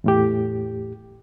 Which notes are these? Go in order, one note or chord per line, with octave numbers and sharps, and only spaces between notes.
E2 A2 G4